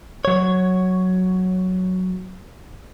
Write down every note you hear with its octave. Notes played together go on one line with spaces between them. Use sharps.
F#3 C#5